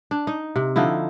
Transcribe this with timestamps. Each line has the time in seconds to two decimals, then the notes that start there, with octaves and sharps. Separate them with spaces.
0.11 D4
0.27 D#4
0.56 C3
0.76 D3 F3 D#4 E4